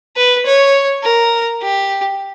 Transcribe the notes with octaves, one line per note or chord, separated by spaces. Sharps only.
B4
C#5
A#4
G4